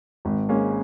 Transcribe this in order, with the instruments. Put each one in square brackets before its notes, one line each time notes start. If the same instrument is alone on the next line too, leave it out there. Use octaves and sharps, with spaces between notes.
[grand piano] G#1
[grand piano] G#3 [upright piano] A#3 C#4